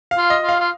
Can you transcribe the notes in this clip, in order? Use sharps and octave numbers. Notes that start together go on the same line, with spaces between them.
F5
F4
D#5
F4
F5
F4